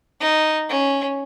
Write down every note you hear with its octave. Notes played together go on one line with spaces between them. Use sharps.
D#4
C#4